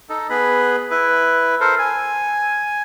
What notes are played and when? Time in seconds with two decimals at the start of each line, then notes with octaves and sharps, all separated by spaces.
0.09 D#4 A4
0.30 B3 G#4 B5
0.91 E4 B4
1.60 A4 A#4 C5
1.79 G#5